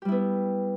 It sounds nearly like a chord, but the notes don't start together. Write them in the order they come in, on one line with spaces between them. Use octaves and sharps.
G4 G3 E4 B3